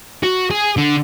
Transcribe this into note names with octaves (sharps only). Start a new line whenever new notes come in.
F#4
G#4
D3